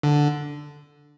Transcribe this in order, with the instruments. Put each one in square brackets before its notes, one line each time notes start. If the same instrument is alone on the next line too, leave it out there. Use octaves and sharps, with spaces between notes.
[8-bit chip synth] D3